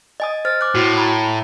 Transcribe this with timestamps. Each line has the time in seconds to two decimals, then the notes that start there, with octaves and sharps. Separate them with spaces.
0.20 D#5 G#5 D#6
0.45 C5 F6 A6
0.61 D6 F#6
0.75 A2 F#4
0.98 A#5 B5